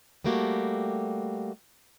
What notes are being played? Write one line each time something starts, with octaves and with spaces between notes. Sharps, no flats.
G3 A3 A#3 F#4 G4